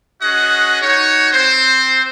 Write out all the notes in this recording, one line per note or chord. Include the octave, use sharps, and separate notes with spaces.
C#4 F#4 G#4 D#5 F#5
D#4 F#4 C#5
C4 C5